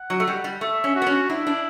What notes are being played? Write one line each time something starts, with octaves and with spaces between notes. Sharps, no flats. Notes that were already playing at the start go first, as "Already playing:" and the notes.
Already playing: F#5
F#3
A3
G3
G3
A3 E5
C#4
F#4
B3
C#4
D4 E4
D4